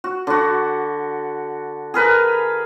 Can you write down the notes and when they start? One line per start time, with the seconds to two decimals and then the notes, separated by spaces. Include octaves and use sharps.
0.04 F#4
0.27 D3 F#4
1.94 G#4 A#4 B4 B5